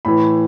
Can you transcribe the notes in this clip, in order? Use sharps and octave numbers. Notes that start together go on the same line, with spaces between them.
A2 E3 B5